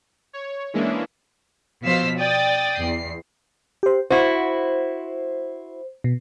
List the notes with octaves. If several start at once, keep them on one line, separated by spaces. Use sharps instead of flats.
C#5
E3 G#3 A#3 C#4 D4 E4
B2 F3 C5 F5 E6 B6
D5 G5 D#6 A6
E2 C7
G4 C5
E4 F#4 C5
B2